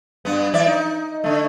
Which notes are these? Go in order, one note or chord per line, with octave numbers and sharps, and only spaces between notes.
G2 B3
E3 D5 E5
D#4
D3 A3